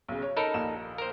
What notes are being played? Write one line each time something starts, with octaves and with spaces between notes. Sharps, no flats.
B1 C#3
C#5
D#4 A4 A#4 B5
A#1 D#2 E7
A#4 C5